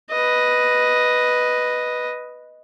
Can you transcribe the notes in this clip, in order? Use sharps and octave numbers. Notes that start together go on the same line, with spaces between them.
B4 D#5